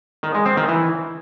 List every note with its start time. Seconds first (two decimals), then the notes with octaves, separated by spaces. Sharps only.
0.23 D#3
0.34 G#3
0.46 C4
0.57 D#3
0.68 E3